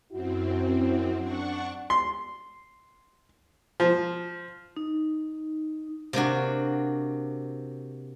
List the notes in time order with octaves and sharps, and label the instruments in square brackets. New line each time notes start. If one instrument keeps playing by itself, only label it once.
[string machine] F#2 C4 [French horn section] E4 F#4
[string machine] D4 F#5 C#6
[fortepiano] C6
F3
[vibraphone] D#4
[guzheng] C3 A#3 D4 F#4